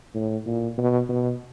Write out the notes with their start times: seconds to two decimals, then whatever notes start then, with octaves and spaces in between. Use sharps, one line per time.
0.15 A2
0.46 A#2
0.78 B2
1.09 B2